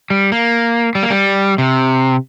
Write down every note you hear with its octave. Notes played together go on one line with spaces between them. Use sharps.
G3
A#3
G3
A#3
G3
C3